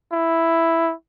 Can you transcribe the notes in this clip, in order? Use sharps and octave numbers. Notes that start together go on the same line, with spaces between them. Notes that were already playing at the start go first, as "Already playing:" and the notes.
E4